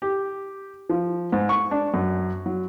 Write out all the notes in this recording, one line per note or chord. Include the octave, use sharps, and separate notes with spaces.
G4
F3
G#2
C#6
D4
F#2
F#3